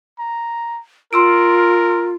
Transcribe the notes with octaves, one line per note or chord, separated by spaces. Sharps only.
A#5
F4 A#4 C6 E6 D7